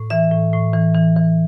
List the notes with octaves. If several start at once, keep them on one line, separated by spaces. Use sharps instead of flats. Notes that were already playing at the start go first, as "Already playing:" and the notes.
Already playing: A2
E3 E5
A2
A2
E3
E3
E3